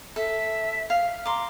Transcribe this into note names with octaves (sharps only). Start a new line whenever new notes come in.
A4 E5
F5
A#5 C6 D6